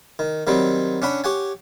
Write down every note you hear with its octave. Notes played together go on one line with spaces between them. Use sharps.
D#3
D#3 F#3 G3 C4
C#4 D4 F#5 B5
G4 C#5 F#5 G#5